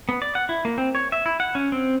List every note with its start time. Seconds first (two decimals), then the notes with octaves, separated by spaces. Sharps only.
0.09 B3
0.22 D5
0.35 F#5
0.49 E4
0.65 A#3
0.78 C4
0.95 C#5
1.12 E5
1.26 E4
1.40 F#5
1.55 C#4
1.72 C4